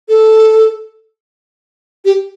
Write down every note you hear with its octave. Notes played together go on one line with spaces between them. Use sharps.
A4
G4